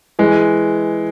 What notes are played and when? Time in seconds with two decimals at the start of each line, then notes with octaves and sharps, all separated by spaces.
0.19 E3 G#3